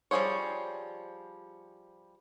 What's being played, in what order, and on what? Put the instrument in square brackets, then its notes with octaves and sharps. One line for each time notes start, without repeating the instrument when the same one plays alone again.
[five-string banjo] F3 G3 G#4 C5 C#5